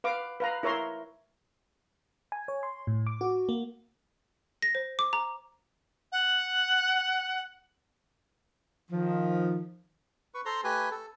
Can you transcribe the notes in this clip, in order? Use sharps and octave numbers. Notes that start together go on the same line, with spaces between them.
B4 F5 D6
B4 F5 A#5
E4 A#4 C#5 E5 A#5 C6
G#5
C#5
C6
A2
D6
F#4
A#3
A#6
C5
D6
A#5
F#5
D#3 F3
B4 C#6
A4 C5 A#5 C6
A3 G4 B4 G#5
A4